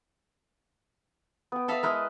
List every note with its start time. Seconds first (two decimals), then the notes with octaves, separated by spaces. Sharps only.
1.52 B3 G5
1.68 A4 E5 F5 A5 B5 D#6
1.83 G#3 E4 A#4 B4 D#5